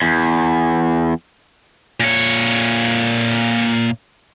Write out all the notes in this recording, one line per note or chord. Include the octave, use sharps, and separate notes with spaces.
E2
A#2 C#5